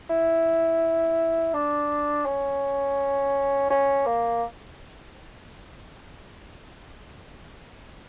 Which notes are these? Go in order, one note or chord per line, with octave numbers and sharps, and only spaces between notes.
E4
D4
C#4
C#4
A#3